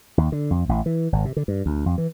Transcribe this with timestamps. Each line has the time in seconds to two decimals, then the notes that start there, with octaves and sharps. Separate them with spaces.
0.18 D#2
0.32 D3
0.51 F2
0.69 A1
0.86 E3
1.12 G#1
1.25 C3
1.37 D3
1.48 G2
1.66 D2
1.86 F2
1.98 E3